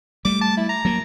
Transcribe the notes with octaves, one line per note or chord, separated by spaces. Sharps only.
G3 A3 D6
A5
E4
A#5
F#3 A#3